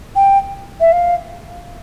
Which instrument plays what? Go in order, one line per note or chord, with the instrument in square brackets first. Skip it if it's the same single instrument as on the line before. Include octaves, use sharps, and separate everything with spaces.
[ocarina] G5
E5
F5